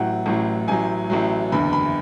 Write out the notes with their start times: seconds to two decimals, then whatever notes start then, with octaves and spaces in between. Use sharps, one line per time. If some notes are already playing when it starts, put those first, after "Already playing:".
Already playing: A1 A2 F#3 F#5
0.26 A1 A2 F#3
0.68 A1 A2 F#3 G#5
1.10 A1 A2 F#3
1.52 F#1 E2 D3 B5
1.73 B5